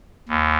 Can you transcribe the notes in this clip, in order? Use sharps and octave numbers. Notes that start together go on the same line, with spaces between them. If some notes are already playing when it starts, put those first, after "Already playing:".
D#2